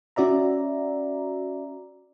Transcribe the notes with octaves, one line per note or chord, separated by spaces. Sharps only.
C#4 F#4 D5 E5 A#5